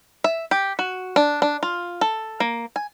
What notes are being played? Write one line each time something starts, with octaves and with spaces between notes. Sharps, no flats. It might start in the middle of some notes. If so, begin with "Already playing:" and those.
E5
G4
F#4
D4
D4
F4
A4
A#3
G#5